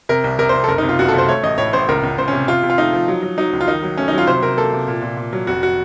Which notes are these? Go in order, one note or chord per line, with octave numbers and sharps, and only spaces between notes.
C3 A#4
C2
C3 A#4
C2 C5
A4
F#1 A#4
C3 D#4
F4
F#1 F#4
A4
C3 C5
A3 C#5
A1 D#5
A2 C#5
A1 C5
C#2 A#4
C#2
C#2 C5
C3 C#4
C3 F4
C3
F4
A3 D#4
F3
F#3
F#3
F#3 D#4
C#2
F4
D#3 D#4
F#3
A3 C#4
F#3 D#4
F4
C3 C5
C3 A#4
A#3 A4
C3
A#2
A#2
A#2
F#3
F1 F#4
F#4